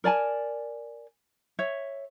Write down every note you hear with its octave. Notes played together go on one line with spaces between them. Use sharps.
A#4 D5 G#5 A5
C#5 E5